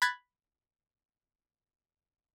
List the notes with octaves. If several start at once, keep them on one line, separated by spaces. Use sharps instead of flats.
B5 F#6 G#6 A6 B6